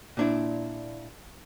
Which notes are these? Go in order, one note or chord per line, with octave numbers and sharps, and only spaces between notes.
A#2 D4 E4